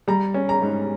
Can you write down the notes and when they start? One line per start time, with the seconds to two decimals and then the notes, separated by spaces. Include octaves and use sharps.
0.08 G3 A#5
0.34 C#4
0.49 A#5
0.62 G#2